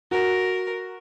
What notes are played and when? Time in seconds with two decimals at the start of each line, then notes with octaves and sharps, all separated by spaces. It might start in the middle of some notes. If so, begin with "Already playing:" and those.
0.11 F#4 A#4